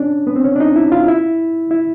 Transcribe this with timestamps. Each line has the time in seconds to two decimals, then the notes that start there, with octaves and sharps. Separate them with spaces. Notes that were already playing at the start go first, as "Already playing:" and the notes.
Already playing: C#4 D4
0.27 B3
0.36 C4
0.44 C#4
0.56 D4
0.60 D#4
0.76 E4
0.92 F4
1.08 E4
1.71 E4